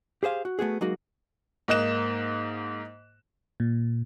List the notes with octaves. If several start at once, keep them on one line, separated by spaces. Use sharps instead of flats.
G4 G#4 C5 F5
F#4
A3 B3 F#4 G#4
F#3 G#3 A#3 D#4 F#4
G#2 A#3 D#5 F#6 E7
A#2